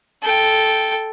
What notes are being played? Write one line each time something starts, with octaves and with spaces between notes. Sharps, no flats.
A4 G5